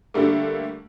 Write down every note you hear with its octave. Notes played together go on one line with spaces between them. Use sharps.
D3 G3 A3 A#3